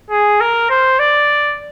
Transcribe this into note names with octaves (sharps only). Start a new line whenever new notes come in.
G#4
A#4
C5
D5